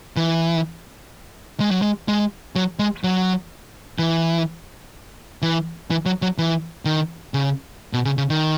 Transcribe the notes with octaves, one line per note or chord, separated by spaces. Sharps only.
E3
G#3
F#3
G#3
G#3
F#3
G#3
F#3
E3
E3
E3
F#3
F#3
E3
D#3
C#3
B2
C#3
C#3
D#3